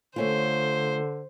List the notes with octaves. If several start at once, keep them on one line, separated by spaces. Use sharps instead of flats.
D3 A3 C#4 F4 C5